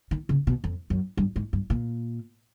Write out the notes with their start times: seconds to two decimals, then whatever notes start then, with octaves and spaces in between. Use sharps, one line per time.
0.11 D#3
0.29 C#3
0.47 B2
0.64 F2
0.90 F#2
1.17 G2
1.36 G#2
1.53 G2
1.70 A#2